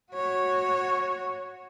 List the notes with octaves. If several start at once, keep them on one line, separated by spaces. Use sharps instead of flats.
F#4 C#5